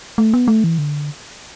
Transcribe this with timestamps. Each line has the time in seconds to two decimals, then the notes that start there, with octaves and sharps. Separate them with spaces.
0.18 A3
0.34 B3
0.48 A3
0.64 E3
0.78 D3